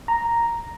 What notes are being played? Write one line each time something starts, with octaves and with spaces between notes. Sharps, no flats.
A#5